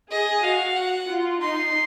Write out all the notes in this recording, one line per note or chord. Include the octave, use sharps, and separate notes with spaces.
G#4 D#5
F#4 F5
F#5
F4
D#4 C6